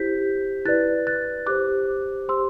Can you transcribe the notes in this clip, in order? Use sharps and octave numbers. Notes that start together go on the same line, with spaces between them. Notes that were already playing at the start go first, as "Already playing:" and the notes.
Already playing: E4 G4 C5 G6 B6
E4 B4 D5 F#6 A6
F#6 A6
G4 C5 D6 F#6
G4 C5 C6 E6